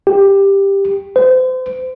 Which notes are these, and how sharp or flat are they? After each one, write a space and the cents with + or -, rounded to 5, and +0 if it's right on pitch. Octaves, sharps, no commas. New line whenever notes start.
G4 +10
C5 -35